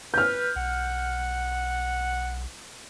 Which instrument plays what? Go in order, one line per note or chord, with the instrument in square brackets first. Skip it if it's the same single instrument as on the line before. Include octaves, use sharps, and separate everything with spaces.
[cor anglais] B4 [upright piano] F6 G6
[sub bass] B1 [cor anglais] F#5